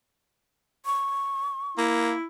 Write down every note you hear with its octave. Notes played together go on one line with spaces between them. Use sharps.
C#6
A#3 E4